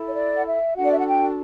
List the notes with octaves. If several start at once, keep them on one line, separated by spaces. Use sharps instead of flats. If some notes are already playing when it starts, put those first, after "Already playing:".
Already playing: E4 A4
C#5
D5
F#5
E5
D4 F#4 A4 F#5
D5
E5
F#5
G5